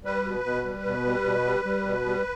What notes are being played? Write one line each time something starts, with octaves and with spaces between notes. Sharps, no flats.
G3 B4
B2
B2
G3
B2
G3
B2
G3
G3
B2
G3